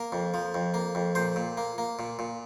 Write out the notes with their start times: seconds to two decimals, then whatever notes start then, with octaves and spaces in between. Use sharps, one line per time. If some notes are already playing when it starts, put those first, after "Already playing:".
Already playing: A#3 A#4
0.12 F2
0.34 F3
0.54 F2
0.74 A#3
0.95 F2
1.15 A#2 C5
1.36 A#2
1.57 A#3
1.78 A#3
1.99 A#2
2.19 A#2